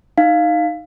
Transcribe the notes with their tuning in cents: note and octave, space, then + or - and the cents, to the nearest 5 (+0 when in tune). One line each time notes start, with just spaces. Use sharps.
D#4 +0 F5 +0